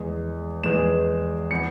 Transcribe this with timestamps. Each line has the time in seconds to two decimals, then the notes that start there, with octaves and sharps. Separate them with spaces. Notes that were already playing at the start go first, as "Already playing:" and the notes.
Already playing: E2 E3 G#3
0.63 E2 E3 G#3 E7
1.51 E3 B3 C#7